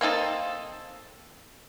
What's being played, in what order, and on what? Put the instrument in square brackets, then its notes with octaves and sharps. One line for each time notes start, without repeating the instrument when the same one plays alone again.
[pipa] A#3 C4 D#4 A4